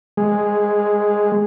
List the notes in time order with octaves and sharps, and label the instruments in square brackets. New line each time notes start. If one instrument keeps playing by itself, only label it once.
[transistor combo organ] G#3